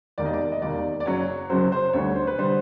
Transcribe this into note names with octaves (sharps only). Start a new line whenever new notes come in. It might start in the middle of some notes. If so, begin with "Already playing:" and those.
E1 D#2 D#3 D5
D#5
D5
D#5
E1 D#2 D#3 D5
D5
F#1 F#2 C#3 F#3 C#5
F#1 F#2 C#3 F#3 C5
C5
D2 D3 G3 C#5
C5
B4
D3 G3 C5